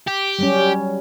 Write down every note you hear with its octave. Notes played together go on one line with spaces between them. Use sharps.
G4
F#3 G3 C#4